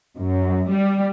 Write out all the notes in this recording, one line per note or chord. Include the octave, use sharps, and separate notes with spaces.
F#2
G3